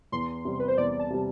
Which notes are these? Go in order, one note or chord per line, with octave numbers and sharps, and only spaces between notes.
E2 C6
C3 G3
B4
C5
E2 D5
A5
C3 G3